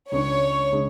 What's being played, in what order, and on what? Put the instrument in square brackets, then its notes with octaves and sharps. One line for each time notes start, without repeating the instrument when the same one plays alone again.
[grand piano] C#2 C#3 G#3 D4 [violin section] C#5
[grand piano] C#3 G#3 D4